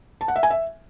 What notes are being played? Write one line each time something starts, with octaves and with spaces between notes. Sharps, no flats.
A5
F#5
E5
G#5
E5